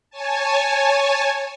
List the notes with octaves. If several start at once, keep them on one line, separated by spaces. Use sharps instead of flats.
C#5 G#5 A5